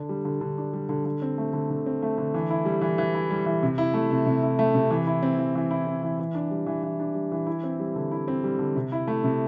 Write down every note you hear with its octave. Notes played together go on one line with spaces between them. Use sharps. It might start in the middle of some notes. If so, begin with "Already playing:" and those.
Already playing: D3 D4
G3
D3
D3
D4
G3
D3
D3
C4
A3
D3
D3
C4
A3
D3
E3
E4
G3
E3
E3
E4
G3
E3
C3
E4
A3
C3
C3
E4
A3
C3
E3
E4
C4
E3
E3
E4
C4
E3
E3
D4
G3
E3
E3
D4
G3
E3
E4
C4
G3
D3
E4
C4
G3
D3
C3
E4
A3
C3